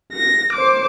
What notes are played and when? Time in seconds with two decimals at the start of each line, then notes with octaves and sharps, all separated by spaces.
0.12 A#6
0.53 C5 D6